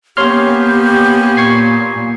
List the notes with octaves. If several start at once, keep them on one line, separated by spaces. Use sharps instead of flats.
A#3 B3 C#4 G4 C#5 C6 F6
A#2 C#6 G#6 C7